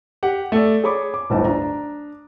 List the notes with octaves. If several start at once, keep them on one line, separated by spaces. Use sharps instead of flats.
G4 F#5
A3 A4 D5
G#4 C#5 B5 C#6 D6
D6
D1 G1 D#4 A5
D4 A#5